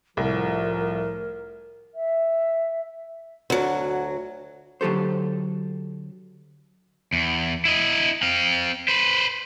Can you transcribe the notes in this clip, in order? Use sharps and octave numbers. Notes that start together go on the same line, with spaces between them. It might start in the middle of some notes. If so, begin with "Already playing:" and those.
C2 A2 F3 A#4
E5
D2 F#3
D3 F#3 G4 A4 C5
E2
E4 D#5
C4 F5
B4 C5